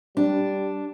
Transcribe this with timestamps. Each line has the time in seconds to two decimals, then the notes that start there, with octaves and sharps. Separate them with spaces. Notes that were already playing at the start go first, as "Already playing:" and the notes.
0.17 G3 D4